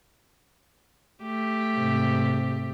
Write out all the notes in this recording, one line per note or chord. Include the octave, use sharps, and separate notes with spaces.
A3 G4
G#2 C3